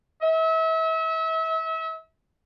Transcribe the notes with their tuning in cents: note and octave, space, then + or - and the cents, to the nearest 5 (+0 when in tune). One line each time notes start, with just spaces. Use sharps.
E5 -35